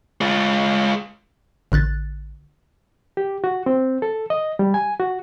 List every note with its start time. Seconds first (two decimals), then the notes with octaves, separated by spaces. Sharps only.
0.21 G#3 F4
1.72 A1 D3 F#6 A6
3.17 G4
3.44 F#4
3.66 C4
4.02 A4
4.30 D#5
4.59 G3
4.74 G#5
5.00 F#4